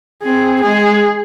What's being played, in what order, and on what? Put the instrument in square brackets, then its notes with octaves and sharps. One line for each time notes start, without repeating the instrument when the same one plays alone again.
[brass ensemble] C4 [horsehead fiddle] G#4
[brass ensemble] G#3 [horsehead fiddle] G#4